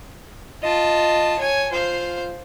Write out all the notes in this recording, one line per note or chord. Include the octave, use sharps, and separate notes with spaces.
F4 D#5 A5
C#5 G#5
F4 C5 F5